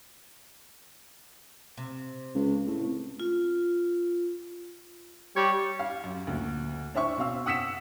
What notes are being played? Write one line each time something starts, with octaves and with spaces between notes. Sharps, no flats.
C3
C#2
A2
F4
G3 C#5
F5
F#2
D2 A#2
D4 C5 E5 C#6
B2 C4 F5 E6
F#5 D#6 E6 B6 C#7 E7